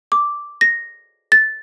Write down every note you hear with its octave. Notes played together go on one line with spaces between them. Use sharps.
D6
A#6
A6